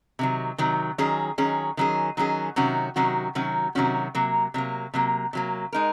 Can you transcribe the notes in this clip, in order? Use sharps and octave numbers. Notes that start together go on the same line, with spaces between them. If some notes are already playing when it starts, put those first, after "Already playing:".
C3 D#3 F#3
C3 D#3 F#3
D#3 F#3 C#4 G#4
D#3 F#3 C#4 G#4
D#3 F#3 C#4 G#4
D#3 F#3 C#4 G#4
C3 D#3 F#3 C#4 F#4
C3 D#3 F#3 C#4 F#4
C3 D#3 F#3 C#4 F#4
C3 D#3 F#3 C#4 F#4
C3 F#3 A#3
C3 F#3 A#3
C3 F#3 A#3
C3 F#3 A#3
G#3 D#4 A#4